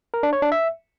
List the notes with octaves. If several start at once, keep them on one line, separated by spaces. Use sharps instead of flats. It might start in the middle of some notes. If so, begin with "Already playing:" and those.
A#4
D4
C#5
D4
E5